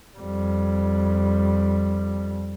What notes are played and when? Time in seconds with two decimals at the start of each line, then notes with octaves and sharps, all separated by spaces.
0.17 F2 G3